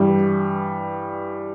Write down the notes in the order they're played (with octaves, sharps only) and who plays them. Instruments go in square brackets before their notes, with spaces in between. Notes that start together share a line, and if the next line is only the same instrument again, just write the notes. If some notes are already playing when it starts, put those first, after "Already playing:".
Already playing: [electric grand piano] G2 E3 G3